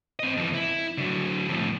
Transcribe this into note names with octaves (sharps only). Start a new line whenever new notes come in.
C4 D#5
F2 E3
E4
D3 F#3
F2 A2